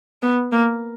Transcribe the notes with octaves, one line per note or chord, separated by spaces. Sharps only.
B3
A#3